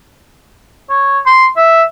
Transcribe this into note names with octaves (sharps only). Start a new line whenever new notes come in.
C#5
C6
E5